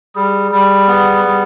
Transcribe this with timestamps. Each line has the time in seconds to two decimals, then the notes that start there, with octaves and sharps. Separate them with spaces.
0.15 G3 G#4
0.52 G3
0.88 B3
1.25 G3